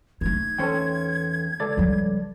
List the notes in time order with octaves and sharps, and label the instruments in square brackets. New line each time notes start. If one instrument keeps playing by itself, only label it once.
[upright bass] A3 D#4 [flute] G#6
[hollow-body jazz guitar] E2 C#4 C5 [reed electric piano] A4 G5
[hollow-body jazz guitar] C#2 [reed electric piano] A4 D5 A6
[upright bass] F3 G3